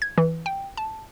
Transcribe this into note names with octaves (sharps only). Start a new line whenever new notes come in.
G#6
E3
G5
A5